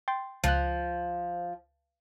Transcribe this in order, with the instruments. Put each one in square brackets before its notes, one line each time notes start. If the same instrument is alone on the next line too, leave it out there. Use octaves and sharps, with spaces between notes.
[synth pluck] G5 C6 A6
[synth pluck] C#2 F#6 [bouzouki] F3